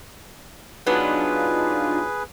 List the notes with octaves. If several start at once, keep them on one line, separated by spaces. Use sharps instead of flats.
F#3 B3 D4 D#4 F4 G#4 B4